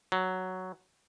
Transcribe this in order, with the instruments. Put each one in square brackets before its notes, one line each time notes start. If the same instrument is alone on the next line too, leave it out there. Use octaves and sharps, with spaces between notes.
[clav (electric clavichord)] F#3